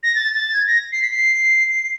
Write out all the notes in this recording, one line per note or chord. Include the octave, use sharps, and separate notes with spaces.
A#6
A6
A6
G#6
A#6
C7
B6
C7
C7